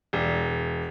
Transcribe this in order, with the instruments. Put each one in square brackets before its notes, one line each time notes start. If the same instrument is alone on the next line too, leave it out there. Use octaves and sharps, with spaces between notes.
[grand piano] E1